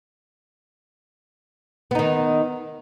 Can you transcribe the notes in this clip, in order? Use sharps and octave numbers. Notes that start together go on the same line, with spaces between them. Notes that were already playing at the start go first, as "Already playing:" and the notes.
D#3 B3 D#4